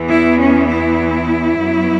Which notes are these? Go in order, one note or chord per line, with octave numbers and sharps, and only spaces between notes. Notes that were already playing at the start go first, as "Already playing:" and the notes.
Already playing: E2 E3 B3
E4
C#4
E4
F#2 F#3 B3